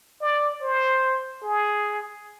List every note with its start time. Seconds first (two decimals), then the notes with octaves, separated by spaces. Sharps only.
0.22 D5
0.61 C5
1.43 G#4